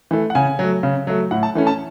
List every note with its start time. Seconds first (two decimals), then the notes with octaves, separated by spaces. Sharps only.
0.11 E3 A3
0.30 F#5
0.35 C#3 G#5
0.59 F#3 A3
0.83 C#3
1.07 F#3 A3
1.31 A2 F#5
1.43 A5
1.55 E3 A3 C#4
1.67 A5